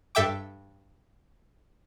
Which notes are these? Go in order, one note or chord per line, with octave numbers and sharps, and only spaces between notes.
G2 A4 E5 G5 D6